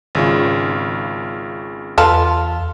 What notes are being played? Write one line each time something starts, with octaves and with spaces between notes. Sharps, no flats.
G#1 C#3 F4
E2 F4 A4 B4 A5